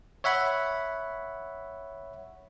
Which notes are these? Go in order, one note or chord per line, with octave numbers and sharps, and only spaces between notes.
C#5 E5 F#5 B5